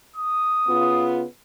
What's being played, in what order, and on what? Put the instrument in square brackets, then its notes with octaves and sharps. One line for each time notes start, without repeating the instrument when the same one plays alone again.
[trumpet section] D#6
[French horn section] C#3 B3 F4